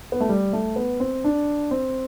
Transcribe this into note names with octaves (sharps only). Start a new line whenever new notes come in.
B3
A3
G3
A3
B3
C4
D4
C4